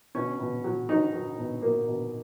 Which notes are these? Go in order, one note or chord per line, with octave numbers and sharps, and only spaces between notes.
B2 C#4
B2
F#3
F#3 D#4
F#3
B2
F#3 A#3
B2